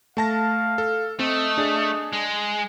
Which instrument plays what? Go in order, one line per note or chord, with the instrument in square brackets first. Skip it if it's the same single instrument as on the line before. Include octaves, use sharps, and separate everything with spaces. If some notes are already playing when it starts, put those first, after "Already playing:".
[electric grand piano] A3 A5 A#6 [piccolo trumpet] F5
[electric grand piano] A4
[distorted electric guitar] A3 [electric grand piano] C4 [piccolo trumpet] D#5
[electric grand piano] D4 G#4
[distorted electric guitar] G#3